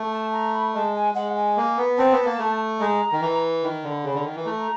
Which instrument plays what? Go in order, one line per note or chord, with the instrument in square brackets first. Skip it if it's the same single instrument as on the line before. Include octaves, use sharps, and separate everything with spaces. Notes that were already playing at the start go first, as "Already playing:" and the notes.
Already playing: [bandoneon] A3
[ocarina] A5
A#5
B5
[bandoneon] G#3 [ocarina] A5
[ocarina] G#5
[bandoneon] G#3 [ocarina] F#5
[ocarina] G#5
[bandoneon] A#3
B3
[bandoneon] C4 [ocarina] A5
[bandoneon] B3
A#3
A3
[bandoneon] G#3 [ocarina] A#5
[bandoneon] D#3
E3
[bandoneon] D#3 [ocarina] B5
[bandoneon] D3
C#3
D3
D#3
E3
[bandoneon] A3 [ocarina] A#5